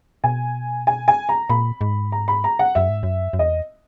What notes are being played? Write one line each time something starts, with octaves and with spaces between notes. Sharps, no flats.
B2 G#5
G#5
G#5
A#5
A#2 B5
G#2
A#5
B5
A#5
F#5
F#2 E5
G#2
F#2
F#2
E2 D#5